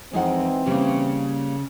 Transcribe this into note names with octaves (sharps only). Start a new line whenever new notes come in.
F2 E3 G#3 C4 D#4 F#5
C#3 G3 A#3